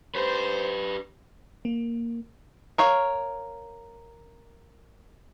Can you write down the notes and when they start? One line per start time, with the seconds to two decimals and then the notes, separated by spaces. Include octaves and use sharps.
0.15 G4 B4 C5
1.65 A#3
2.78 A#4 C#5 F5